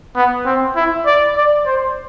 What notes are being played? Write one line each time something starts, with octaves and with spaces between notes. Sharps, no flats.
B3
C4
E4
D5
D5
C5